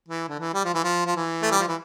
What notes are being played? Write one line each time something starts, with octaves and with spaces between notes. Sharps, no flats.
E3
D3
E3
G3
F3
E3
F3
F3
E3
A3
G3
F3
E3